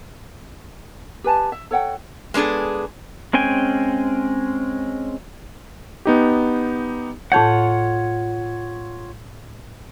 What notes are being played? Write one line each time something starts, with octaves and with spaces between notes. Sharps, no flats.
G4 B4 G#5 A5
E5
A4 C#5 F#5 G5
G#3 B3 D4 G#4 A4
G#3 C4 C#4 G5 G#5
B3 D#4 G4
A2 F4 C#5 F#5 A5 G6